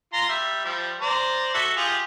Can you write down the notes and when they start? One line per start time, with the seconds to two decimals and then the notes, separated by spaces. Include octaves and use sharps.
0.13 F4 A#5 C6
0.29 G3 E5
0.65 F3 G3
1.01 C5 D5 A#5
1.54 F#4 A4 E5
1.76 F4 G4 G#4